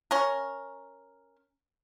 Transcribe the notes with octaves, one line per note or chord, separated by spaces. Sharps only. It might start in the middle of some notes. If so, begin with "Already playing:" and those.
C#4 A#4